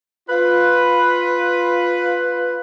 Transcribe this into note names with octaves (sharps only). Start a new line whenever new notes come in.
F4 B4